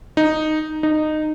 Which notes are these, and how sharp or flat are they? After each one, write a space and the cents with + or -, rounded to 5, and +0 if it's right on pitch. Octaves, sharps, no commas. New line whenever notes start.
D#4 -5
D#4 -15